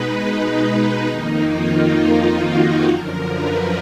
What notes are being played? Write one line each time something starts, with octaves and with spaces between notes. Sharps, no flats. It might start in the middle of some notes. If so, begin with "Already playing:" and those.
Already playing: B2 G#3 D#4 B4
D#4
F2 D#3 A#3
F4
F#4
F#2 D3 F3 A#4
B4